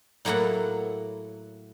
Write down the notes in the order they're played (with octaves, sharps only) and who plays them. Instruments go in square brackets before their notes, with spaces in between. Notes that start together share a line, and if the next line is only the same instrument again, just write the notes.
[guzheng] A2 F#3 A#3 E4 A4 F#5